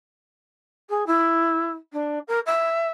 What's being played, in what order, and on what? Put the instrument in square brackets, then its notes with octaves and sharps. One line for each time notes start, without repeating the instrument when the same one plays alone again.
[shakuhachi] G#4
E4
D4
A#4
E5